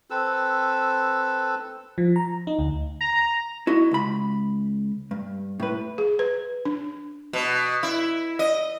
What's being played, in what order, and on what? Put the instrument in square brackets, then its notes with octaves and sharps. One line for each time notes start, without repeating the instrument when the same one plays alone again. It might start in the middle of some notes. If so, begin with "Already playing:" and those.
[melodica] C4 A4 B4 E6
[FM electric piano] F3
A#5
D#4
D2
[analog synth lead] A#5
[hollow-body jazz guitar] E4 F#4 D#5
C#2 B5
G2
A2 B4
[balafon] G#4
B4
D4
[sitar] B2
E4
D#5